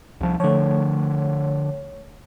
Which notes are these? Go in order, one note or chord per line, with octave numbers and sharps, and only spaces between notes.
C2 F3
D3 F3 A3 C#5